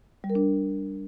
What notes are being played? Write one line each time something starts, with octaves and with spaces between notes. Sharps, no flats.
G3
A#4
D4